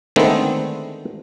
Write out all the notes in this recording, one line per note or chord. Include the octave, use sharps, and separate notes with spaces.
D3 D#3 G#3 A3 B3 C4